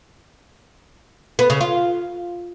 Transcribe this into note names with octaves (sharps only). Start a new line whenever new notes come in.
B3
C#3
F4